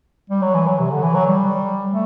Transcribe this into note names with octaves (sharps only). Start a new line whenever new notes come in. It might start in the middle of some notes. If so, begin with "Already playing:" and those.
G3
F#3
E3
F#3
C3
D3
E3
F#3
G3
A3